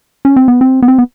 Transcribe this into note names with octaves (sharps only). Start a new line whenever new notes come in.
C#4
C4
B3
C4
B3
C4
B3